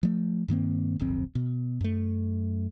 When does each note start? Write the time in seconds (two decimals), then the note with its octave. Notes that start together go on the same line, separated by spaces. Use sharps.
0.03 F3 A3
0.48 G2 D#3 A#3 C4
0.99 D1 G1 F2 C4
1.35 B2
1.81 F#2 A3